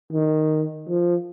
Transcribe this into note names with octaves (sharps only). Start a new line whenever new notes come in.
D#3
F3